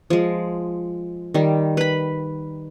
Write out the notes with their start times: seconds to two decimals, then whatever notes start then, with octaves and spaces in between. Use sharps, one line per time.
0.10 F3 G#3
1.34 D#3 G3
1.77 B4 B5